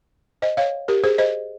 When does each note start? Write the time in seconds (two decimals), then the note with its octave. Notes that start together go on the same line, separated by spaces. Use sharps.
0.42 C5 D#5
0.57 C#5 F5
0.88 G4 A#4
1.04 G#4 C5
1.18 C5 D#5